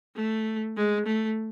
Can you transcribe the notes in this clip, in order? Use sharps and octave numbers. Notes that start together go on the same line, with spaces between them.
A3
G#3
A3